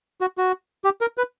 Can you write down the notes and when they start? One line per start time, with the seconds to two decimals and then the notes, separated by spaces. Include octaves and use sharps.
0.21 F#4
0.38 F#4
0.84 G4
1.01 A#4
1.18 B4